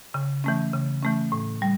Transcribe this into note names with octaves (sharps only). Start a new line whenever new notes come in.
C#3
E3 A3 C#4
C#3
E3 A3 C#4
A2
G3